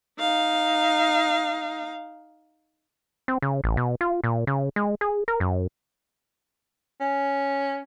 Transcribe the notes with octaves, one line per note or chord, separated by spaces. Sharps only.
D#4 F5
C4
C#3
A1
B2
F4
A#2
C#3
G#3
G#4
A#4
F#2
C#4